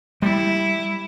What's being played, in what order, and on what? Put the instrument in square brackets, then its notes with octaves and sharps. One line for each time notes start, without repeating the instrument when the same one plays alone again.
[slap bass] G3 [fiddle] E4